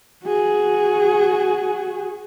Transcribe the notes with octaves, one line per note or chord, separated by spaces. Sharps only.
F#4 G#4